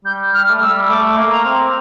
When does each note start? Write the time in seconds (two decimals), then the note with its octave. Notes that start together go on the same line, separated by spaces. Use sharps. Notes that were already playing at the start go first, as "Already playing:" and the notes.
0.05 G3 G6
0.33 G3 F6
0.50 A3
0.61 G3 E6
0.89 A3 D6
1.17 A#3
1.31 A#5
1.45 C4